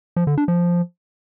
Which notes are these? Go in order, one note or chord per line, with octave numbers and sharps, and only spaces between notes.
F3
D3
D4
F3